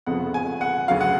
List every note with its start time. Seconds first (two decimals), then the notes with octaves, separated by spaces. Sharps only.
0.06 F1 F2 C#3 F3 B3 F#5
0.34 G#5
0.61 F#5
0.88 D2 C#3 F#3 F5
1.01 F#5